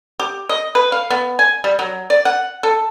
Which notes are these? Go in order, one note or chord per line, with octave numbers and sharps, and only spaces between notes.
G4
D#5
B4
F5
B3
G#5
G3
F#3
D5
F#5
A4